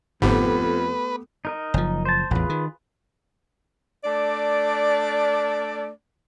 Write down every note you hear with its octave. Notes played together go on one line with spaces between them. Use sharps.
G1 F2 G#2 A3 B3 G4 B4
D#4 A#4 D#5
F#1 F3
C5 A5
A1 E2 F4 G#4 B4
D#3
A3 D4 D5